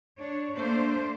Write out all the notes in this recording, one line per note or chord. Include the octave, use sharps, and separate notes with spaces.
D4 C#5
A3 A#3 D4 C5